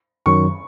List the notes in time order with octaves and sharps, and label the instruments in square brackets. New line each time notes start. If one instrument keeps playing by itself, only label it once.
[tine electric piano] F#2 D#3 F#3 [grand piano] C#6